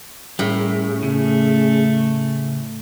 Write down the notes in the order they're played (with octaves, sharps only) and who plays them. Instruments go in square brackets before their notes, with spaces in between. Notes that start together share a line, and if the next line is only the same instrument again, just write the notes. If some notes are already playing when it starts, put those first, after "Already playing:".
[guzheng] A2 [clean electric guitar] G3 A#3 [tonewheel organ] C#4 G#4
[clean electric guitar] C#3 [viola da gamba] A3